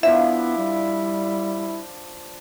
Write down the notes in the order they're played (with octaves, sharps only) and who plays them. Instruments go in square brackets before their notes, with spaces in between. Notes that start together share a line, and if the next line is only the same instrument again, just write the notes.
[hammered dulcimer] F3 D4 F4 [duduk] B3 [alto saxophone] E4 [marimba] E5
[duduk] G3